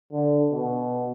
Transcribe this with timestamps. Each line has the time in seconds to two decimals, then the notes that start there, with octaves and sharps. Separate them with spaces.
0.12 D3
0.51 B2